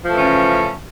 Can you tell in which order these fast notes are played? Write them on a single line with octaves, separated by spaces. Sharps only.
F3 A3 E3 C#4 C#3